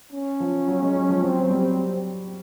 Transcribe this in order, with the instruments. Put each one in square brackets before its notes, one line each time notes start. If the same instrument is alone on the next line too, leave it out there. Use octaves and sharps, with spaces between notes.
[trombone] C#4
[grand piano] F3
F#3
G#3
F#3
F3
[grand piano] F#3 [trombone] C4
[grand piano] F#3
G3